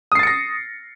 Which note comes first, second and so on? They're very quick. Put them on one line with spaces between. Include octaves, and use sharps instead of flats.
D#6 C7 A6 C#7 A#6